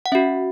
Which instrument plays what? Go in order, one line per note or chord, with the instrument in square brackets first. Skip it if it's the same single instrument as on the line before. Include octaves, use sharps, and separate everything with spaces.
[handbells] F#5
C#4 F#4 E5